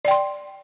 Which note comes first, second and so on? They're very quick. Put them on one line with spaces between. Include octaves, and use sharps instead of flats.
D5 G5 C6